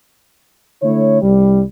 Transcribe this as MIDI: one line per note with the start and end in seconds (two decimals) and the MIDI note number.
0.82 1.19 50
0.82 1.19 57
0.82 1.19 64
0.82 1.19 73
1.22 1.62 36
1.22 1.62 55